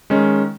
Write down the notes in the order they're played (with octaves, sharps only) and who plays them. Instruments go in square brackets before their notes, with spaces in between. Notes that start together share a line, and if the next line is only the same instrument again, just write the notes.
[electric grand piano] D#3 G#3 C#4